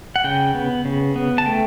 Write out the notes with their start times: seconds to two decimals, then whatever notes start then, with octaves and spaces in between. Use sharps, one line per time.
0.16 F#5
0.24 C#3 G5
0.55 B3
0.85 C#3
1.16 B3
1.38 A5
1.46 A3 G5